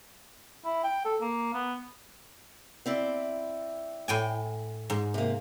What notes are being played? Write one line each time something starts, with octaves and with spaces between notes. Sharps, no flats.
E4
G5
A4
A#3
B3
C4 E4 D5
A2 G5 G#5
G#2
C3 A#3